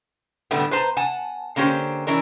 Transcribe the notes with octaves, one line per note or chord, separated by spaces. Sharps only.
A2 D3 G3 A3 B3
B4 C5 A5 A#5
F#5 G#5 A5
D3 A#3 C#4 G4 C5
E3 C#4 D4 A#4